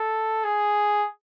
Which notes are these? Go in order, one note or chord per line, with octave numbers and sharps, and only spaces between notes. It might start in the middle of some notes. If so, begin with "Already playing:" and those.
Already playing: A4
G#4